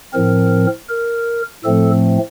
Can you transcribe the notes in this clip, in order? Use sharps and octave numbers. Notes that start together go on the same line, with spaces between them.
A2 F3 C4 A#4
A#4
A2 F3 A3 C4 A4